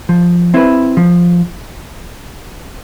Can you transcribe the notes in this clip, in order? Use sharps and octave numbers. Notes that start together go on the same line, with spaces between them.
F3
C4 E4 B4
F3